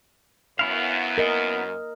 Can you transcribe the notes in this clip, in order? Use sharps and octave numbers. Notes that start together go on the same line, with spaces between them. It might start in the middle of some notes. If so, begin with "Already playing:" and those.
F#2 B3 E4 F5
A#4 D#5